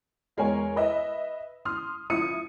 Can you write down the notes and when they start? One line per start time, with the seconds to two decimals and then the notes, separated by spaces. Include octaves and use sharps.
0.37 E2 G#3 A#4 C#5 G#5
0.76 B4 D#5 E5
1.65 C6 D#6 F6
2.10 F3 E4 D#6 C#7 D#7